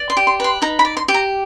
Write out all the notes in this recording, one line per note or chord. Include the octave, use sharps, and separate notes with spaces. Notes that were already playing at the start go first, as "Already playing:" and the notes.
Already playing: D5
C6
G4
C6
B4 C6
D#4 A#5
B5
D5
C6
G4
A#5